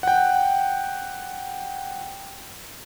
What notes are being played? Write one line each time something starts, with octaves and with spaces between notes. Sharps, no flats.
F#5 G5